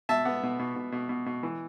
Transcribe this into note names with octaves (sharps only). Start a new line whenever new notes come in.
B2 E5 A5
B3
B2
B2
B2
B2
B2
B2
E3